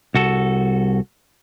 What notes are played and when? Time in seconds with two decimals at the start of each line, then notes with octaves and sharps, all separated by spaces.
0.14 C2 F#4 A4